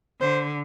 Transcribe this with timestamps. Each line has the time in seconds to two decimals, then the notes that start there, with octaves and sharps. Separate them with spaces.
0.21 D3 C5